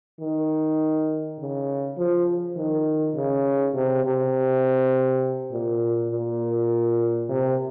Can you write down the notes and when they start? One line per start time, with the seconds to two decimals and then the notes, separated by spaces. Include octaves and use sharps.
0.21 D#3
1.39 C#3
1.98 F3
2.57 D#3
3.15 C#3
3.75 C3
4.04 C3
5.52 A#2
6.11 A#2
7.29 C3